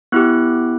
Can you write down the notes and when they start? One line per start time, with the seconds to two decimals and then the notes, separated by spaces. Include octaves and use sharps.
0.12 B3 E4 G4 F#6